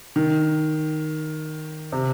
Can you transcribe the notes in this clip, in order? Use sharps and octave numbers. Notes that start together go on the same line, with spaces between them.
D#3
C3